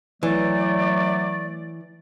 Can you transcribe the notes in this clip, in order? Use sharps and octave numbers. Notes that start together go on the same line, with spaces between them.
E3 F#3 A3 D5